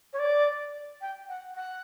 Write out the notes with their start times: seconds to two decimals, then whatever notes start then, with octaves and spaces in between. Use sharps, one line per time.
0.13 C#5
0.18 D5
1.01 G5
1.28 F#5
1.55 F#5